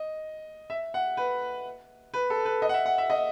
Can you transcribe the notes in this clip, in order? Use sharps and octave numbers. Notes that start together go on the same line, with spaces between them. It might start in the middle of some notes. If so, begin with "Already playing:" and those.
Already playing: D#5
E5
F#5
B4
B4
A4
B4
D#5
F#5
E5
F#5
E5
D#5